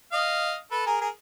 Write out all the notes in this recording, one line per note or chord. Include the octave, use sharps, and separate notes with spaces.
D#5 F5
A4 B4
G#4 A#4
G#4 A#4